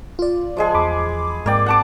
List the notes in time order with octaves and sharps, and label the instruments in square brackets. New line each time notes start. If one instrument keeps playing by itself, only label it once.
[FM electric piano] F4 D5
[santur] F3 G#3 G#4
[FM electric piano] E2 B5 D6
[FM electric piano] G#2 C4 G5 [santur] A#3 D5
[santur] F#5 A5 D6